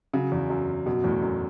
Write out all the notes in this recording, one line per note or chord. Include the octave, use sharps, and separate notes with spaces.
C#3 F#3
E2
F#2
F#2 B2
E2 A2
F#2 B2